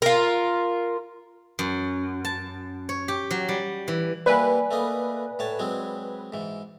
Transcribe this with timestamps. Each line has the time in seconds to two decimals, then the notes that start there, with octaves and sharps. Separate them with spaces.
0.02 F4 A#4
1.59 F#2
2.25 A5
2.89 C#5
3.08 G4
3.31 F#3
3.49 G3
3.88 E3
4.26 G3 A#3 E4 B4 D5 G#5
4.71 A3 A#3 D#5
5.39 A2 C#5 A5
5.59 F#3 G#3 C4
6.32 G#2 E3